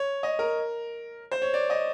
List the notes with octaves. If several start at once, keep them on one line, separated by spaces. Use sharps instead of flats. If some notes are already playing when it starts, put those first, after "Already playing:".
Already playing: C#5
D#5
A#4
C5
C#5
D5
D#5